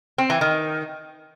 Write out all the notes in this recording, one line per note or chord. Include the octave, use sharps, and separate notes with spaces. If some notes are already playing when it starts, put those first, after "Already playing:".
C4
E3
D#3